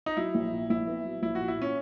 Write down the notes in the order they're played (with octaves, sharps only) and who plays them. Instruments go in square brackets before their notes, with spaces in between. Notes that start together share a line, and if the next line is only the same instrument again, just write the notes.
[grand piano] D#4
[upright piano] F#3 [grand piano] E4
[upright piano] A#1
A#2
[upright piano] A#1 [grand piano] E4
[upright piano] B3
F#3
[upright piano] A#1 [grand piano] E4
[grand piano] F#4
[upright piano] A#2
[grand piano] E4
[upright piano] A#2 [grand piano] C#4